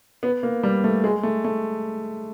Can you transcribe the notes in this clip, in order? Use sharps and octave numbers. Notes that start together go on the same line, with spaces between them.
B3
A#3
G3
A3
G#3
A3
A3